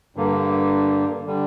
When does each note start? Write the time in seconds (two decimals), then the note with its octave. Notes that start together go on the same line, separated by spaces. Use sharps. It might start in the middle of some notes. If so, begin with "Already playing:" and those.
0.16 G2 D3 A#3
1.27 D3 G3